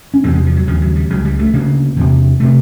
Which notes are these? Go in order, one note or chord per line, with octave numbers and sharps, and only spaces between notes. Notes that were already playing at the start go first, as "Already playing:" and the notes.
C#4
E2 C3 C4
G#3
F3
F#3
D#2 C#3 F3
F#3
G3
C#2 C#3 F#3
G3
A3
D2 C#3 A#3
E2 C3
C3 A3